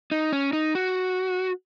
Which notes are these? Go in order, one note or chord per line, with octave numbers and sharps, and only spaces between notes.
D#4
C#4
D#4
F#4